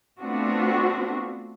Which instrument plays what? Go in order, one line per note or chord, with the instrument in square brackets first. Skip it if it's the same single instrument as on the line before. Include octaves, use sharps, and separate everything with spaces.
[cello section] A3 B3 C4 D4 F4 F#4